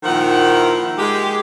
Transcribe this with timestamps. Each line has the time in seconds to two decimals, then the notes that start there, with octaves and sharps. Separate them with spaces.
0.03 A#2 D#3 F3 E4 A#4 F#5
0.98 G#3 G4